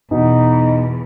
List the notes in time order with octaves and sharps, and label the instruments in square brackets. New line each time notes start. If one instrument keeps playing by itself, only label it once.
[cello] E2 [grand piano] B2 [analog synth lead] D#4